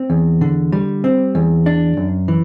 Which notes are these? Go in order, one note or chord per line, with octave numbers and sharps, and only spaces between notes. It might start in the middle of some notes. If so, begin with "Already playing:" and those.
Already playing: C4
E2
D3
G3
C4
E2
D4
F#2
E3